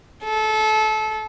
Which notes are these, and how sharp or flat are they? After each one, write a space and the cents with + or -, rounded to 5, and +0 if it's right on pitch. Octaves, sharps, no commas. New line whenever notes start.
A4 -25